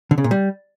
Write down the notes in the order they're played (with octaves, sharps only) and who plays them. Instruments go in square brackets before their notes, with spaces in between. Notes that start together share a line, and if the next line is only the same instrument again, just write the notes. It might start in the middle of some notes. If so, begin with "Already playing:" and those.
[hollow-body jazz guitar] D3
C#3
A#2
G3